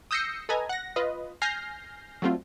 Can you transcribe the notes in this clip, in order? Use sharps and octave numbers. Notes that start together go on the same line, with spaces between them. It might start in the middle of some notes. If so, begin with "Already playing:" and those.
D#6 E6 G6 A#6 C7 C#7
A4 B4 D#5 G#5 A#5
F#5 A#6
F4 B4 D#5
G#5 F6 G6 A#6 C7
F#3 G3 A3 C4 F4